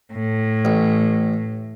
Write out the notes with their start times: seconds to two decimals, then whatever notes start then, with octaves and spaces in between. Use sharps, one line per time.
0.14 A2
0.65 A1